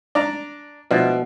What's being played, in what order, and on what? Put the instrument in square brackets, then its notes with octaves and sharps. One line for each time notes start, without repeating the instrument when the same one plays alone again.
[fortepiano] D4 D5 A#5
[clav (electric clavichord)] B2 [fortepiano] F3 D4 E4